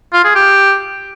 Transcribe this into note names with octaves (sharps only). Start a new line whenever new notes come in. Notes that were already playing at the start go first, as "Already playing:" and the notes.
F4
G#4
G4